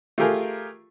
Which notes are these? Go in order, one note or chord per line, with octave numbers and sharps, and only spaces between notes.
A3 F4 G4 G#4 A#4